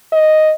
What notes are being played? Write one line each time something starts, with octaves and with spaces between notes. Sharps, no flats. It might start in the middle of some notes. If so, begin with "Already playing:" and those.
D#5